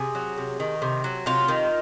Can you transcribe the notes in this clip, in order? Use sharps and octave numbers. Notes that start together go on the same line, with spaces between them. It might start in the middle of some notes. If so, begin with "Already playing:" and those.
Already playing: C3 G#4
F#3
C3
D#3
C3
F#3
C3 F4
D#3